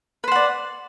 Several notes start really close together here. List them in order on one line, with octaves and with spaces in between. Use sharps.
B4 C5 F#5 D5